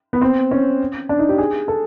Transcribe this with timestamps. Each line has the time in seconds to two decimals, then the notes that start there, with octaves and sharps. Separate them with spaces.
0.13 B3
0.21 C4
0.51 C#4
1.09 D4
1.19 D#4
1.29 G4
1.38 G#4
1.68 A4